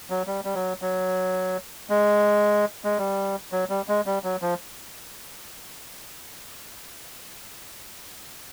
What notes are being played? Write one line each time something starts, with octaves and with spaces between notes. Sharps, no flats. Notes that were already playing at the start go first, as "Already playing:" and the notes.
F#3
G3
G3
F#3
F#3
G#3
G#3
G3
F#3
G3
G#3
G3
F#3
F3